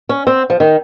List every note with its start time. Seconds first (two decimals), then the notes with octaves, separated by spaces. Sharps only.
0.09 C#4
0.27 C4
0.50 F3
0.60 D#3